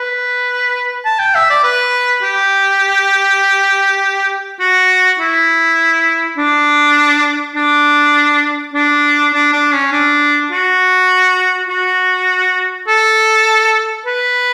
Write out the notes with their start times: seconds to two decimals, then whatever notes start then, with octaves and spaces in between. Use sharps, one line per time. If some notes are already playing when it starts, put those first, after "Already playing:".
Already playing: B4
1.05 A5
1.19 G5
1.34 E5
1.50 D5
1.63 B4
2.23 G4
4.60 F#4
5.19 E4
6.37 D4
7.56 D4
8.74 D4
9.33 D4
9.53 D4
9.72 C#4
9.92 D4
10.51 F#4
11.69 F#4
12.88 A4
14.06 B4